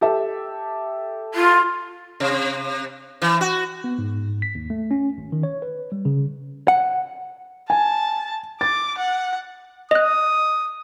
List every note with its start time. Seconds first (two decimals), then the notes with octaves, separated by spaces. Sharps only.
0.01 G4 A4 E5
1.34 F4
2.20 C3
3.22 E3
3.41 F#4
3.84 B3
3.98 G#2
4.42 B6
4.55 D#2
4.70 A3
4.91 C#4
5.18 G#1
5.32 D#3
5.43 C#5
5.62 B4
5.92 G3
6.05 C#3
6.68 F#5
7.70 G#5 A5
8.61 D6 A6
8.97 F#5
9.91 D#5 D#6 F#6